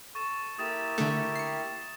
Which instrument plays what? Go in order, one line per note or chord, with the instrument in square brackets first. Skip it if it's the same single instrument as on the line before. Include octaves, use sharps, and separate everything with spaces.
[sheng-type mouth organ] A4 [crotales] C#6 A6 E7
[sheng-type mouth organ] A#3 E4 G4 [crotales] D#6 A6 E7
[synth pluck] D3 A3
C7 C#7